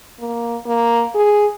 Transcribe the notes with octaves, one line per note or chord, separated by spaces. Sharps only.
A#3
A#3
G#4